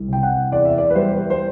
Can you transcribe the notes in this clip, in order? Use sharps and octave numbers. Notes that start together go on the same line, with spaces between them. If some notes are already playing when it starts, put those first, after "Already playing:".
Already playing: C2
C3 G5
F#5
E2 D5
E5
D5
B4
G3 C5
C5